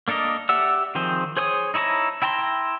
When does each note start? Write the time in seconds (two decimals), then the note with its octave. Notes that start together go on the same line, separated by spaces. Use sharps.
0.08 A#3 D4 A4 A#4 D#5
0.49 G4 D5 E5 F#5 E6
0.95 D#3 F3 C4 G#4 C5
1.37 G#4 C5 C#5 G#5 D#6
1.74 D#4 E4 C#5 A5 A#5
2.22 E4 G5 A5 A#5 C6